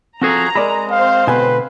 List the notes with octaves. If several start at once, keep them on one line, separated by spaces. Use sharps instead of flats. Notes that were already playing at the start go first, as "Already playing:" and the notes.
F3 C4 F#4 G#4 A4 A#5
G#3 A#4 D5 B5
C4 C5 F5
B2 D3 B4 G#5